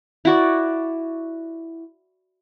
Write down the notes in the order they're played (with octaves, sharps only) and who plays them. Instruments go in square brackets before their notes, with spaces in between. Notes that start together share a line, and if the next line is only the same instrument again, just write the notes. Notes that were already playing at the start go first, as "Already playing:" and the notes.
[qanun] E4 F#4 D5